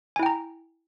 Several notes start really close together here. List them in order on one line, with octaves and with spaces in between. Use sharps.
G#5 E4 G5 A#5